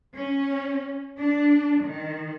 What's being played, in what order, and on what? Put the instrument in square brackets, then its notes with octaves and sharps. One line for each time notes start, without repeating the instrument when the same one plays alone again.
[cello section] C#4
D4
D#3